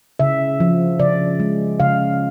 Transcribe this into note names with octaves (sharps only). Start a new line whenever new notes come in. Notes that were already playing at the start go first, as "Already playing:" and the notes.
C#3 E5
F3
C#3 D5
G#3
C#3 F5